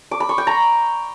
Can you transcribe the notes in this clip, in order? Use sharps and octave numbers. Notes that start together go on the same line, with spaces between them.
D6
B5
C#6
G5
A#5